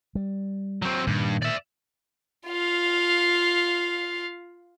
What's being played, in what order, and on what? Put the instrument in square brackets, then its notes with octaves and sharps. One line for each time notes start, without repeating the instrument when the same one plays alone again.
[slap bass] G3
[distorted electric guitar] F#3 C4
[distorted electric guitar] G2 [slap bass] A#2 D#3
[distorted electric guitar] D5 E5
[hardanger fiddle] F4 F5